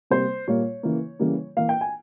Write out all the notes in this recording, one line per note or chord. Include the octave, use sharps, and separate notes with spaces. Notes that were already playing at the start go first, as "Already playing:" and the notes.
C3 G3 A#3 C5
A#2 G3 A#3 C#5
C#3 E3 A#3
C#3 E3 G3 A#3
E3 A#3 F5
G5
G#5